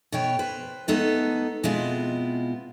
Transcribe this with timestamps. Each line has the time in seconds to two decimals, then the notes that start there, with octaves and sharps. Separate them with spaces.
0.12 B2 B3 C#5 G5
0.39 B4 C5
0.88 G#3 A3 B3 D#4 A4
1.63 B2 G#3 B3 C4 E4 F4